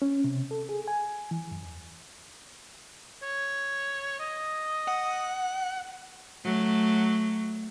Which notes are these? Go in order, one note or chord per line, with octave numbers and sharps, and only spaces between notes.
C#4
C3
A4
G#4
G#5
E3
F#2
E2
C#5
D#5
F#5
F#3 A3